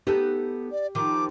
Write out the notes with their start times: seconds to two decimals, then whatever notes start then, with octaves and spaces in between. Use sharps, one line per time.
0.07 B3 D#4 G4 A4
0.72 D5
0.95 D#3 F3 D6